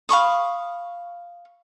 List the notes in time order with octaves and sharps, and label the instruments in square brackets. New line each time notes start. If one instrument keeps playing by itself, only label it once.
[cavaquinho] F5 B5 C#6 D#6